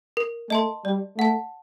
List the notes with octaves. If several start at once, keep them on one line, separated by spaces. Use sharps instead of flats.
A#4
A3 D#5 A5 C6
G3 D5
A3 F#5 A5